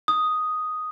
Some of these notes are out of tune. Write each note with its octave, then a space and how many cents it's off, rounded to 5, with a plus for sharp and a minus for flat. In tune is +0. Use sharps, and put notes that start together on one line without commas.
D#6 +0